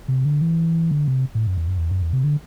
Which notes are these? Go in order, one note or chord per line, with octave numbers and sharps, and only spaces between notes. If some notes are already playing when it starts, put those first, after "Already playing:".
C3
D3
E3
D3
C3
A2
F#2
E2
F#2
E2
F#2
E2
C3
D3